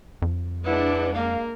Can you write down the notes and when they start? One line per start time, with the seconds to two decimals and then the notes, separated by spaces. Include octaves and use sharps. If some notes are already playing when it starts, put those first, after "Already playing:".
0.22 F2
0.65 G#3 D4 E4 B4 F#5
1.14 A#3 A#4 F5